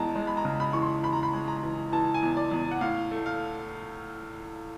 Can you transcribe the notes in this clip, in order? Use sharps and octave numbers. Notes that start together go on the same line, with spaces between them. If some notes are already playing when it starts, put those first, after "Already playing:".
Already playing: E2 E3 G#3 A5 A#5
G#3
B5
A#5
C#3
B5
E3 C#6
C6
E3 B5
A#5
B5
G#3
A#5
E3
E3 A5
G#5
E2
D5
E2
F#5
A2 F5
A3
F5